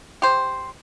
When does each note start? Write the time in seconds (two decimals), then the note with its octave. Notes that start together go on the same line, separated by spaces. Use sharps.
0.22 G4 C5